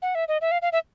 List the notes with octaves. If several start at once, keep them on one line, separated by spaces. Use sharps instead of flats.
F#5
E5
D#5
E5
F5
F5
E5